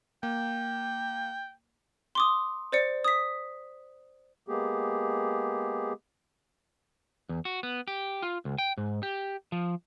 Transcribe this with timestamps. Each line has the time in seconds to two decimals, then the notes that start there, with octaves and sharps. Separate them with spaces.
0.23 A#3 G5
2.15 C6 D6 D#6
2.72 C5 D5 C#7
3.04 D#6 B6
4.48 G#3 A#3 B3 G4 G#4
7.29 E2
7.45 F#4
7.63 B3
7.88 G4
8.22 F4
8.45 C#2
8.58 G5
8.78 G#2
9.03 G4
9.52 F3